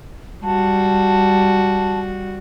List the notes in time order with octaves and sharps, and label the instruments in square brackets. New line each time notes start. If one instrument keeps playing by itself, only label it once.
[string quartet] G3 F#4 [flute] A5